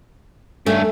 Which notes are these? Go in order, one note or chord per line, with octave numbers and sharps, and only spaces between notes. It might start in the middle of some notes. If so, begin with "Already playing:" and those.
G2 A3 C#4